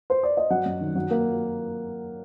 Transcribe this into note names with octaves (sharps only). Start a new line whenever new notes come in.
C5
D5
D#5
F#3 F#5
F#2
D#3
F#3
A#3